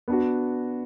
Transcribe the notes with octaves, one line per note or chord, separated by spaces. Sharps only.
B3 D4 F#4